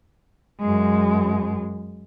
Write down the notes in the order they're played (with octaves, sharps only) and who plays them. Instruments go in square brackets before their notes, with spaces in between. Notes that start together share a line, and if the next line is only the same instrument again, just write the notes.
[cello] F#2 G#3